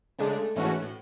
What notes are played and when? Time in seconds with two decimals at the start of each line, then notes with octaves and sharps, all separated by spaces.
0.19 C#3 G#3 A3 D4
0.55 G#2 E3 A3 C#4 F#4
0.82 A2